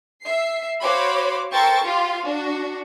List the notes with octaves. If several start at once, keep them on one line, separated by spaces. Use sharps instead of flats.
E5 C7
F#4 C5 C#5 F5 B5 D6
A4 A#4 C5 G5 C#6 A6
F4 G4 F5
D4 F#4